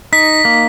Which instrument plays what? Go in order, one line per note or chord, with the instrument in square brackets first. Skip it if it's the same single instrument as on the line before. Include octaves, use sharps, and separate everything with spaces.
[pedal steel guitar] D#4 [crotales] B6
[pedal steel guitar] A#3